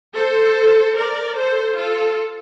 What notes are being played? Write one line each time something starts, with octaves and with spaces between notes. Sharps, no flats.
A4 C5
A#4 D5
A4 C5
F4 A4